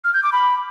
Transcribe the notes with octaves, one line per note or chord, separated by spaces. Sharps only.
F6
G6
D6
B5